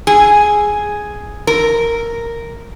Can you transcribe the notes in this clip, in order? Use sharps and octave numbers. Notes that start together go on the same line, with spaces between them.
G#4
A#4